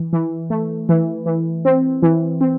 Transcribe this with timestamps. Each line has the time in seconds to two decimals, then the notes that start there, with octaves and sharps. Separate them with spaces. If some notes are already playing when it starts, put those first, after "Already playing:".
Already playing: E3
0.13 E3
0.50 A3
0.89 E3
1.26 E3
1.65 C4
2.02 E3
2.41 C4